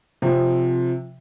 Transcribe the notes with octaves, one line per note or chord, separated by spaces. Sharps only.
C3 F3 C4